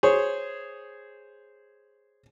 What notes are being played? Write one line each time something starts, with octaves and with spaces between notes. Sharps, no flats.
G#4 C5 C#5